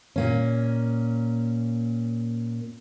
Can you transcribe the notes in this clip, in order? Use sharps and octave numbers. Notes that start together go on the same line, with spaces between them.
A#2 A#3 C#4